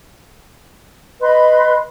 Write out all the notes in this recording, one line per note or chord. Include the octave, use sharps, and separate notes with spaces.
B4 D#5 B5 C6